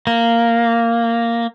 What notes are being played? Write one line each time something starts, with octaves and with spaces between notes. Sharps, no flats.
A#3